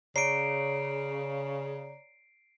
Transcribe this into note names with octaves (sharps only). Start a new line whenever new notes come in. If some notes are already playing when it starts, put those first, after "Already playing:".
C#3 C#5 D5 A#5 C7 D7